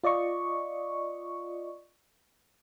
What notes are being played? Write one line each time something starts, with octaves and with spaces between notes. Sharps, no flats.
F4 D5 D#5 C#6